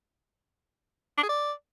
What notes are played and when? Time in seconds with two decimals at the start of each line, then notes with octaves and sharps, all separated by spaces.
1.17 D4
1.23 G#4
1.29 D5